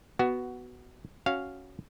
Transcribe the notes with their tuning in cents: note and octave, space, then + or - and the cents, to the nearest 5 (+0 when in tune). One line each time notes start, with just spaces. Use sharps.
B3 +0 F#4 +10
C#4 +0 F#4 +0 F5 -5